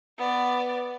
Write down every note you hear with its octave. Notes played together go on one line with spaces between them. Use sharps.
B3 D5